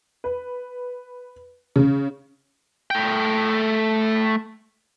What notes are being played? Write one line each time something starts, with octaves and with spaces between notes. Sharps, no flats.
B4
C#3
A3 G5